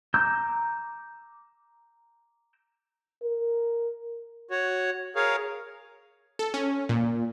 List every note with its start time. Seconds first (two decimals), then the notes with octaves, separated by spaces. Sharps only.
0.14 A#5 D6 E6 G6
3.23 A#4
4.51 F#4 C#5
5.16 G#4 A#4 C#5 F5
6.39 A4
6.54 C#4
6.89 A#2